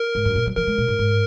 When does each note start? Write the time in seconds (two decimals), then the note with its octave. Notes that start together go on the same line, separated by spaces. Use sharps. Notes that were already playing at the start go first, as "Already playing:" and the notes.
Already playing: A#4
0.15 G#2
0.25 F#2
0.35 A#2
0.46 F#3
0.57 F3 A#4
0.67 G#3
0.78 A#2
0.88 G#2
0.99 G#2